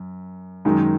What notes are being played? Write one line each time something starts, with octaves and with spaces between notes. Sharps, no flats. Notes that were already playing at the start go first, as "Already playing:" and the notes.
Already playing: F#2
F#2 D#3 G#3 D#4